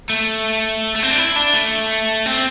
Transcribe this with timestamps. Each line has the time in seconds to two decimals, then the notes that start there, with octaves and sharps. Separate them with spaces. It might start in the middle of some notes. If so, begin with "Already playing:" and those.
0.10 A3
0.96 A3
1.03 C4
1.10 D4
1.18 E4
1.36 D4
1.54 A3
2.26 C4